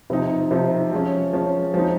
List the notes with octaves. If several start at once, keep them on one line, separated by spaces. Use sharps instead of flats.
C3 F3 C4 D#4
C3 F3 C4 D#4
F3 G#3 C#4
F3 G#3 C#4
F3 G#3 C4 D#4